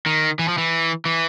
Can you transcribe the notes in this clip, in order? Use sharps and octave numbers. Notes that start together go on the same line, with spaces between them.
D#3
E3
F3
E3
E3